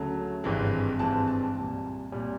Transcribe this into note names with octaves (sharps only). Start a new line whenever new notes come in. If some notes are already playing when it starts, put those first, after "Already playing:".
Already playing: D2 C#3 F#3 A3 A5
G#1 G2 E3 G#3 C4
G#1 G2 E3 G#3 C4 A5
A5
C2 A#2 G3
C2 A#2 G3